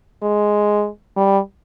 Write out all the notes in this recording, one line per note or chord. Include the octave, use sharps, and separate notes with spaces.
G#3
G3